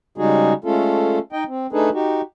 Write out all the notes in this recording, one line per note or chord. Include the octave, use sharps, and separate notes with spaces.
C#3 G3 G#3 D#4 F#4 G#4
G#3 A3 C#4 F4 A4
D#4 D#5 G5
C4
A3 D4 D#4 G#4 A4 B4
D#4 F#4 G4